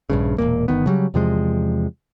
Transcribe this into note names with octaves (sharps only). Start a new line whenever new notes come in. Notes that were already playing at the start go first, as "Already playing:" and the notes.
A#1 G2 C#3
E1 G2 A#2 A#3
G1 F#2 D#3 B3
C#3 F#3 G3
E2 C3 F3 G#3